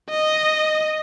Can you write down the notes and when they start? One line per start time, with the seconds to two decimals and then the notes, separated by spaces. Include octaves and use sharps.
0.10 D#5